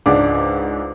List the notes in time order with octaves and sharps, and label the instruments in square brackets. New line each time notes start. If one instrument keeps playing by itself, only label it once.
[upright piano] C#2 G#2 D4 F#5 D6